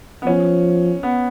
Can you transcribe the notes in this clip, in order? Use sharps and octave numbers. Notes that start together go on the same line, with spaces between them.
B3
F3 C#4
B3